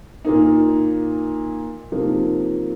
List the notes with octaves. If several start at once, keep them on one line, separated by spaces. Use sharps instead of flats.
A#2 A#3 D#4
C3 F3 A#3 D#4